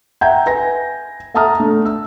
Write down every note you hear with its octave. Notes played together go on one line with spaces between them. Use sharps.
E5 F#5 G5 A#5 G6 G#6
B4 G#5 A#6
E5 F#5 A5 A#5 D#6 F6
A3 D4
E6